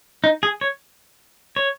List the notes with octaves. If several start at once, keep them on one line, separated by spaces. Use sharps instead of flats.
D#4
G#4
C#5
C#5